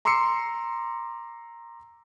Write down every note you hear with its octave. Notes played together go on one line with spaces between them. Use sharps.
A#5 C6 D6 E6 C7 C#7